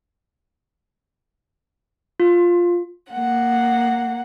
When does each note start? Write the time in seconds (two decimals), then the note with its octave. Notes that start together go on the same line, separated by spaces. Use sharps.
2.20 F4
3.10 A#3 F#5